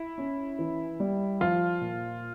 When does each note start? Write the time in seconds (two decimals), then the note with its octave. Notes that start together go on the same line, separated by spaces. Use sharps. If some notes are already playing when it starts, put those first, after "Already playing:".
Already playing: E4
0.18 C#4
0.59 E3
1.00 G3
1.41 F3 F4
1.81 A#2